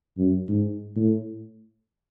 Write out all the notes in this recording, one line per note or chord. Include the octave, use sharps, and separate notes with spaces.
F#2
G#2
A2